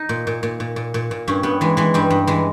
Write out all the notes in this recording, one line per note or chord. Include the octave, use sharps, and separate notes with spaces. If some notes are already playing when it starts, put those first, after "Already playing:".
Already playing: D#4
A#2
A#2
A#2
A#2
A#2
A#2
A#2
G2 C#4
G2 B3
E3 G#3
E3 G#3
G2 G3
G2
E3 G#3